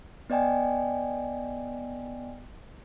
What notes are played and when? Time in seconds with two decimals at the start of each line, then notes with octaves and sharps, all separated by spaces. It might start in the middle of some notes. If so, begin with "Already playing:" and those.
0.30 B3 D5 D#5 G5 G#5